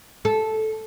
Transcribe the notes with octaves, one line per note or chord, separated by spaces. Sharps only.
A4